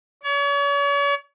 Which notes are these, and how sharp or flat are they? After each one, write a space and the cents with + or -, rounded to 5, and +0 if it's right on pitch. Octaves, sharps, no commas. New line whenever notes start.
C#5 +40